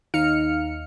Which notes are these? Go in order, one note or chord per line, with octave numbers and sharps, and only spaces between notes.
D#2 D#4 F5 F6 C#7